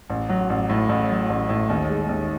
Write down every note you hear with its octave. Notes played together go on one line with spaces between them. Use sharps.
A1
F#3
A1
A2
A1
F#3
A1
A2
D#2
G#3
D#2